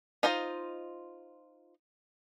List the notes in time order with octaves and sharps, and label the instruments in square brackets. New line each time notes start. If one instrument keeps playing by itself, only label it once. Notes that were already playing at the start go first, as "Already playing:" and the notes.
[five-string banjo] D#4 F4 C5 D#5